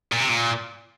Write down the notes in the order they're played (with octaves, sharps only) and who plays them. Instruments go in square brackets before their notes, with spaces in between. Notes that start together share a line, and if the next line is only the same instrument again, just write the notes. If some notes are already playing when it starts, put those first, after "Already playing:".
[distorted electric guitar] A#2
C3
A#2